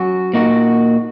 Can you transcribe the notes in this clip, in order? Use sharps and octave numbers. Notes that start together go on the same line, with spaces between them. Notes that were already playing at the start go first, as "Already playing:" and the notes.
Already playing: F#3 C#4 F#4
A#2 A#3 D#4 F#4